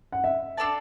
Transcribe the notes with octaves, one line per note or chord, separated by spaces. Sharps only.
F#5
E5
D4 A4 D5 A5